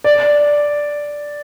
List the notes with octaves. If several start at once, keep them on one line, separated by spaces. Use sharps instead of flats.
D5